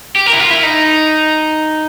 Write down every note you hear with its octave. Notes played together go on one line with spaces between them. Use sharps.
G4
A#4
E4
F4
E4
D#4